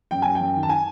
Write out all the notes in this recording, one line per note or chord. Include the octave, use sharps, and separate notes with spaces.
F#2 G5
F#2 G#5
G5
F#2
D#3
A5
G#5